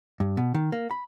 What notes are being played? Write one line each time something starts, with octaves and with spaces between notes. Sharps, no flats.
G2
B2
D#3
A#3
B5